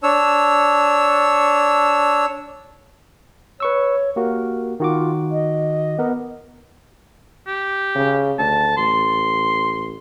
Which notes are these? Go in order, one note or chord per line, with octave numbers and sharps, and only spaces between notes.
D4 C#5 E6
B4 C#5 C#6 E6
A#3 F#4 G4 A#4
D#3 F4 F#4 D6
D#5
B3 A#4
G4
C#3
D2 A5
A1 C6